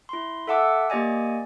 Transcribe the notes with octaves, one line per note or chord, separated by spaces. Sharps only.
E4 C6
A4 E5 F#5 A5 D6 E6
A#3 G4 D5 D#5 G#5